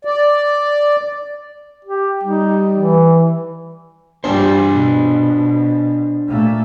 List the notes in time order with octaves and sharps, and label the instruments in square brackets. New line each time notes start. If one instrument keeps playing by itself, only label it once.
[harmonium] D5
[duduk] G4
[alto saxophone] G3 [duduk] D#4
[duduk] E3
[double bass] G2 G3 [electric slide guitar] D4 C5
[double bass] B2
A#2 A3